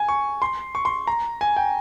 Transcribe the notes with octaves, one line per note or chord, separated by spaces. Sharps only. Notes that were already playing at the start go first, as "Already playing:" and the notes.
Already playing: G#5
C#6
C6
C#6
C6
A#5
G#5
G5